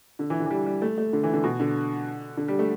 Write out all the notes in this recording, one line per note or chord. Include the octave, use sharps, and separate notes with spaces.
D3
E3
D3
E3
G3
G3
A3
A3
D3
E3
D3
B2
D3
D3
G3
A3